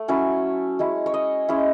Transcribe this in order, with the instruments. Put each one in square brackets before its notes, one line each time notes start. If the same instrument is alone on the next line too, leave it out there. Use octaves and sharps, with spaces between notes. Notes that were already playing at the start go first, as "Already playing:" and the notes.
Already playing: [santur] A3
F#3 C#4 E4 C#5
G#3 C#4 E4
C#5
D#5
G#3 C#4 E4